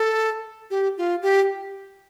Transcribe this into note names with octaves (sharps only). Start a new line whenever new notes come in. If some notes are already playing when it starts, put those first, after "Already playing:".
Already playing: A4
G4
F4
G4